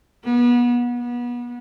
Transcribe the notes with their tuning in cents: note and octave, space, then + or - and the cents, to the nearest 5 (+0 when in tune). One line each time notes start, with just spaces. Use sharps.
B3 -30
B3 -30